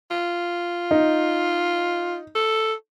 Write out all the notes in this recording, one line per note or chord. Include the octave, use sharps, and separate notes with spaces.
F4
D#4
A4